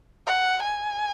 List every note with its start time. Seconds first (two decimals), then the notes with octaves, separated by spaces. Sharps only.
0.27 F#5
0.63 G#5